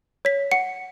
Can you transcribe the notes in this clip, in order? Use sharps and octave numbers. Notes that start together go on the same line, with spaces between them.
C#5 B6
F#5 C#7